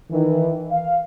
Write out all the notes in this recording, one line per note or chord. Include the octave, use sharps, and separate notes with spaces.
D#3 E3
F5